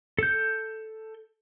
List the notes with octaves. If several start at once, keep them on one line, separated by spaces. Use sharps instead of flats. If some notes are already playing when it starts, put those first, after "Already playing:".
A4 G6